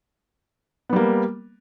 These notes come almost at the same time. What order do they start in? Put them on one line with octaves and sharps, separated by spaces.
B3 G3 A#3